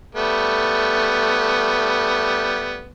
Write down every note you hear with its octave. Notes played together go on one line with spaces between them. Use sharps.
G3 A3 B3